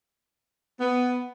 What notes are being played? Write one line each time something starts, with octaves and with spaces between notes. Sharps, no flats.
B3